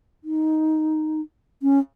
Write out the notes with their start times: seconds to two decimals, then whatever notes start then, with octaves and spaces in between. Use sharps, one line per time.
0.24 D#4
1.63 C#4